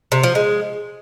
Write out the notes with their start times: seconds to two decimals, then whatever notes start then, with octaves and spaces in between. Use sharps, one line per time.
0.12 C3
0.23 F3
0.35 G#3